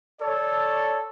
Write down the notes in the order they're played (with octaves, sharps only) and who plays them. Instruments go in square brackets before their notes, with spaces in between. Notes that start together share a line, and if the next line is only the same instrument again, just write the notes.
[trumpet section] A4 C#5 D5